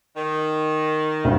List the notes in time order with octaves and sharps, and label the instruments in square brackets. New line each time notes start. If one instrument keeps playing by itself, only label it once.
[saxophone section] D#3
[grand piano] D2 G2